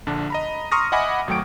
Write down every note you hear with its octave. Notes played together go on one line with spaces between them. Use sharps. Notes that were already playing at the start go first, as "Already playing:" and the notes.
A#1 D3 D4
D#5 A#5 B5
A#5 C6 C#6 D#6 F6 A#6
D#5 E5 F#5 G#5 B5 D6
G#1 F#3 A3 G5 C#6 D7